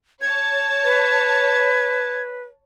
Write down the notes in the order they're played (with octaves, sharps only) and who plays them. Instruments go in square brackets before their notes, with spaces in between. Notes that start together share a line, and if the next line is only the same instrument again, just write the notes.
[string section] C#5 A5 [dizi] G#6
[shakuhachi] B4